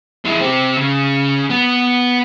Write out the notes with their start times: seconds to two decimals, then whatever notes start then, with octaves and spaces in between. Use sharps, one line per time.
0.25 G#3 E4
0.41 C4 G4
0.77 C#3
1.50 B3